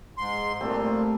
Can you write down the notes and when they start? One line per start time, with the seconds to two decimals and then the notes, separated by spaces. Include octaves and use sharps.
0.18 G#2 C6
0.61 A#2 G3 A3 C4